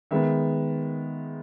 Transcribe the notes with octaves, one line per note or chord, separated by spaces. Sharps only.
D#3 G#3 B3 E5